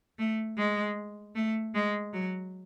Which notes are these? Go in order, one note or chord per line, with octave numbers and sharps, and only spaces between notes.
A3
G#3
A3
G#3
F#3